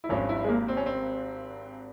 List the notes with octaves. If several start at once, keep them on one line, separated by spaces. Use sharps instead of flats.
E4
G#1 G2 F3 C#4
E4
G#3
A#3
C4
C#4
C4